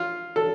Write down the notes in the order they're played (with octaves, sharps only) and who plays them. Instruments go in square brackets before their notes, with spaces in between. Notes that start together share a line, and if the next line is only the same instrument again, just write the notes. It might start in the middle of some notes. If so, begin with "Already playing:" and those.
Already playing: [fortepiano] F4
A4